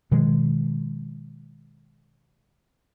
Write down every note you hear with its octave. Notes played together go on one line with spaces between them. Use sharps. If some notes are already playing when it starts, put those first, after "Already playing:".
B2 D#3 F3 G#3